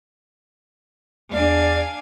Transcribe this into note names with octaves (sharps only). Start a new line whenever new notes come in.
E2 D4 D5 F5 G#5